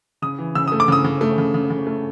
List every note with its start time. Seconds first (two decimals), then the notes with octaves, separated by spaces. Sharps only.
0.22 C#3 D#6
0.39 E3
0.55 C#3 E6
0.68 A3 D#6
0.80 D6
0.88 C#3 D#6
1.04 C#3
1.21 A3
1.38 C#3
1.54 C#3
1.70 C#3
1.87 A3